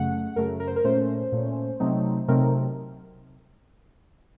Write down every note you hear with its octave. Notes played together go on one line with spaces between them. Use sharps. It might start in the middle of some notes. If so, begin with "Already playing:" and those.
Already playing: F#2 C#3 A3 F#5
F#2 C#3 A3 A#4
A#4
C5
A#4
A#2 A3 C#4 C5
A#2 A3 C#4
C3 F#3 A3 C4 D#4
C3 F#3 A3 C4 D#4 A#4